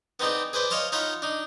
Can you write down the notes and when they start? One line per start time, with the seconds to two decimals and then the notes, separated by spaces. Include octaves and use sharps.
0.20 B3 C4 D#4 G#4 D5
0.53 G#4 B4 C5 D5
0.70 C#5 D#5 F5 A5 C6
0.92 D#4 F4 C#5 F#5 B5
1.22 D4 D#4